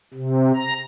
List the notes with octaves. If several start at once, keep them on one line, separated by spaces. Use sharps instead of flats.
C3
A#5